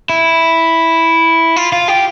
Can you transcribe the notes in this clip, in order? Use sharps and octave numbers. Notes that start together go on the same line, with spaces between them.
E4
F4
F4
G4